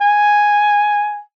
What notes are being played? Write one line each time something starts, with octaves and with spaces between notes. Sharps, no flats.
G#5